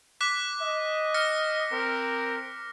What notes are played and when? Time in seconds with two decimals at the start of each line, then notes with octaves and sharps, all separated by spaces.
0.21 D6 F#6 B6
0.61 D#5
1.14 F6 A#6 C#7
1.72 C4 A#4